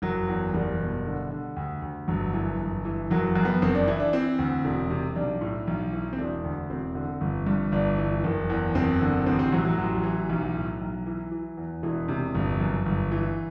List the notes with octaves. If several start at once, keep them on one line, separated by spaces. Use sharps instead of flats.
F#1 F#3
E2
F#1 G3
B2
D3
D3
D2
D2
G1 F#3
F#2 E3
G1
E3
F#1 F#3
F#2
B3
F#1 C4
D4
E3 E4
D4
E3 C4
D2
E1
C3
B1 D4
A2
B1
E3
C4
E1 D4
D2
E1 C4
D3
G1
G2
G1 D4
E3
F#1
E2
F#1 C4
D3
A1 C4
C4
A2 F#3
F#3
A1 F#3
E3
B1
A2
B1
E3
E3
E2
E1 E3
C3
G1
F#2
G1
E3